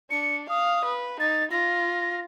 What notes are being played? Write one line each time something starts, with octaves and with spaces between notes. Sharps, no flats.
D4 C#7
F5 D#6
B4
D#4 A6
F4 A#6